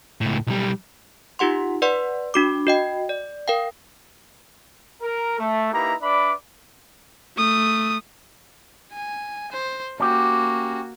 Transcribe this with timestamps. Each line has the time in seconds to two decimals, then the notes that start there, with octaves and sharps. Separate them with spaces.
0.21 C#2 A2
0.47 B1 G3
1.39 D#4 F4 G4 F#5 C6
1.82 B4 D5 F#5 C6
2.34 D4 F#4 D6
2.67 F#4 D#5 G5
3.09 D5
3.48 A#4 F5 G5
5.02 A#4
5.38 A3
5.72 A#3 D#4 E4 G4 B4 A#5
6.01 D4 B4 D5 E5 B5 D6
7.37 A3 D#6
8.93 G#5
9.52 C5
10.00 A#3 C#4 F#4 G4